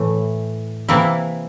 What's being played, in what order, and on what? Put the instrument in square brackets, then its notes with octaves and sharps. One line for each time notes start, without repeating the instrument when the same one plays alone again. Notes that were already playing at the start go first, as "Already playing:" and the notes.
Already playing: [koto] A2 E3 A3
C3 E3 A#3 E4